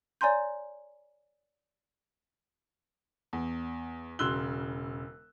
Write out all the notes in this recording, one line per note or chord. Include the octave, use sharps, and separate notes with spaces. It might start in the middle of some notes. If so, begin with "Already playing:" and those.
C#5 D5 G#5 A#5 C6 G6
E2
E1 C#3 C6 E6 F#6 G7